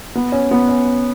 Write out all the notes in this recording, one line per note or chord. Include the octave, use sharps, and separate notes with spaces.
B3
C#4
B3
C#4